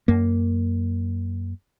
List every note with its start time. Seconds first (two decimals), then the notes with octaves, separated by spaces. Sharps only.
0.08 F#2 A#3